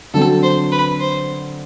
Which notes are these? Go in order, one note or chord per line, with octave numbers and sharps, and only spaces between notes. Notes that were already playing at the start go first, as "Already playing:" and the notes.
D3 F#3 C4 A4
C5
B4
C5